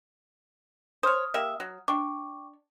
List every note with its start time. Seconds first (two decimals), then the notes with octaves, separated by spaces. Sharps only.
1.03 C5 C#5 D#6 F6
1.34 A#3 G4 E5
1.60 F#3
1.88 D4 G5 C#6 D6